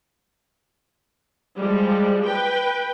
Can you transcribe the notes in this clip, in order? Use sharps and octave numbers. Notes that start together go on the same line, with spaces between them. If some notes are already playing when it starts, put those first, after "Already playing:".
F3 G3 G#3
B4 G5